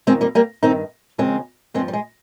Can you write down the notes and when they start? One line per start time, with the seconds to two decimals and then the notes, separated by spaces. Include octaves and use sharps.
0.07 F2 D#3 G#3 C4
0.21 G3 A#3
0.35 G3 A#3
0.63 G2 D#3 C4 D#4
1.18 D#2 C#3 F3 G#3 C4
1.74 G2 G#3 C4
1.79 F3
1.88 G3
1.93 G#3